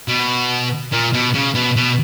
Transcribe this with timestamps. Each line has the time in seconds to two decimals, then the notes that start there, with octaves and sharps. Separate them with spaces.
0.08 B2
0.92 A#2
1.13 B2
1.34 C#3
1.55 B2
1.76 B2